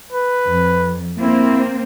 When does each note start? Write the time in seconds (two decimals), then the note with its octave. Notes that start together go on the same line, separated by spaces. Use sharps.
0.12 B4
0.47 F2
1.19 A#3 C4 E4